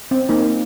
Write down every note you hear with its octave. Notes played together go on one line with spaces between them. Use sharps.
C4
A#3 D#4